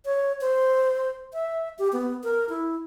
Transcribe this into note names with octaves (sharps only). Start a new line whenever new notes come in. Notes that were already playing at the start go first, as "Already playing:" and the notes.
C#5
C5
E5
G4
B3
A#4
E4